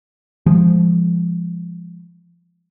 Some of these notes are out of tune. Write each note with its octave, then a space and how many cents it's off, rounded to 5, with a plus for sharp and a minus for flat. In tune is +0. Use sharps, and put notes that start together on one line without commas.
F3 -20 G#3 -20